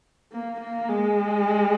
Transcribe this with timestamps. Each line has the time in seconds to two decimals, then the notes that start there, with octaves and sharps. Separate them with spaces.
0.32 A#3
0.61 A#3
0.89 G#3